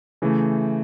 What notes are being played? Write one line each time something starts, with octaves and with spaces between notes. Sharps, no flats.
C#3 E3 A3